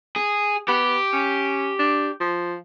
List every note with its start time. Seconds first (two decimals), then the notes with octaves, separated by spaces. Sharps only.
0.16 G#4
0.68 B3 G4
1.13 C#4
1.79 D4
2.20 F3